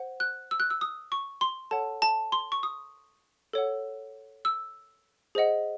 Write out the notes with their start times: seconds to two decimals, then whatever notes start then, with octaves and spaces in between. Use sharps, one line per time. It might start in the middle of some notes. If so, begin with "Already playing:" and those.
Already playing: C5 F#5
0.20 F#6
0.51 E6
0.60 F#6
0.70 E6
0.81 D#6
1.12 C#6
1.41 C6
1.71 A4 C#5 F#5 A5
2.02 A5
2.32 C6
2.52 C#6
2.63 D#6
3.53 A4 C#5 F#5
4.45 E6
5.35 G#4 C5 D#5 F#5